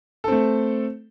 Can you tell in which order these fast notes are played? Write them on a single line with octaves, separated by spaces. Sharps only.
A4 C4 A3